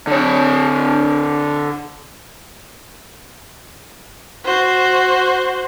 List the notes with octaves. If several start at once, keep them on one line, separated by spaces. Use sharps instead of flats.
D3 C#5
F#4 C5